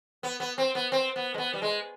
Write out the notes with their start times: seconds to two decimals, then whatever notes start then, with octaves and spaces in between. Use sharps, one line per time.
0.23 B3
0.40 B3
0.58 C4
0.75 B3
0.92 C4
1.16 B3
1.34 G#3
1.38 B3
1.53 G3
1.62 G#3